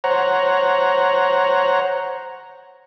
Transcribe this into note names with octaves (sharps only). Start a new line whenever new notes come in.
C5 C#5 F#5 A#5